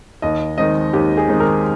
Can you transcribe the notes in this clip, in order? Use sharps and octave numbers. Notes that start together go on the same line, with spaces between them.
D#2 D#5
D#3 G#3 C4 D#4 D#5
D#2 G4
G#4
D#3 G#3 C4 D#4
A#4